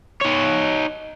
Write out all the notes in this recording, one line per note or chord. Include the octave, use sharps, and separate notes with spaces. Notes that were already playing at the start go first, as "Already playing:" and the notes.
D#4 C#5